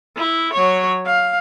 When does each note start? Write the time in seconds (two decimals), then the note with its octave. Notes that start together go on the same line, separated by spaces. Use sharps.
0.17 E4
0.53 F#3 C#5
1.06 F5